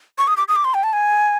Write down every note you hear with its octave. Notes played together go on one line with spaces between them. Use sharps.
C#6
D#6
D6
D#6
D6
C6
G5
A5
G#5